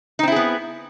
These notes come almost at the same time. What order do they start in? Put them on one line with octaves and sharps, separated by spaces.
D#4 C4 E4 G#4 B3